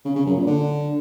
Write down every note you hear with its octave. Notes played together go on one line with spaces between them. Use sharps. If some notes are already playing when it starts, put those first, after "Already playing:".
C#3
C#3
F#2
A#2
D3